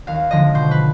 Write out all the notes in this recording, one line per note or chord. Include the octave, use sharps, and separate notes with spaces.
D#2 F5
D3 F3 G#3 D#5
B2 C5
B4